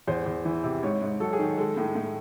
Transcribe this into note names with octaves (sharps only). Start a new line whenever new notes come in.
E2 C5
E2
E3
C3
G#2 C#5
G#2
F#3 A4
G#4
D#3
G#3 A4
A2
A2